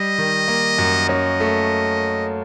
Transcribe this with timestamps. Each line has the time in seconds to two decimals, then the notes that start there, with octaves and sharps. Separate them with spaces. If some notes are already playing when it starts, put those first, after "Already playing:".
Already playing: G3 D#5
0.18 D#3
0.48 A#3
0.78 F#2
1.09 C#4 D#5
1.40 A3